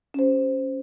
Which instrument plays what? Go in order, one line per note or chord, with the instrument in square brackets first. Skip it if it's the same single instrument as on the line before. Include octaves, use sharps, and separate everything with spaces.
[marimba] C#4 G4 C5